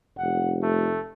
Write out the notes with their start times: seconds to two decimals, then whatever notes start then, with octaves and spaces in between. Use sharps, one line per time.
0.19 F1 F#5
0.63 A3